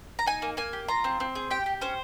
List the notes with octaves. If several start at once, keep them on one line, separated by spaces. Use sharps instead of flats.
A#5
D#4 G#5
A#3
A#3 G#5
G4
F4 A#5
C4
C4
G#4
G4 G5
G4
C#4 C5